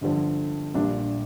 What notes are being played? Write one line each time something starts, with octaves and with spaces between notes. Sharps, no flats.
G1 G2 D3 F3
A#1 A#2 G3 D4 F4